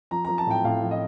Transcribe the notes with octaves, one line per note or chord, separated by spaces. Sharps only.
F3 A#5
F3 A#5
A5
A2 G5
A2 F5
F3
D#5